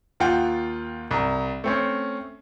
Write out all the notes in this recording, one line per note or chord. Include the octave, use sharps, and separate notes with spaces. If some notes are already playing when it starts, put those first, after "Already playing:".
D#2 F4 F#5 G5
C2 A#5
A3 C4 C#4